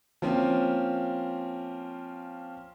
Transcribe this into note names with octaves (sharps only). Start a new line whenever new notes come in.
F3 A#3 C4 C#4